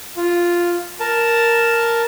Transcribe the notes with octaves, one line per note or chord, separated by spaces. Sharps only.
F4
A#4 A5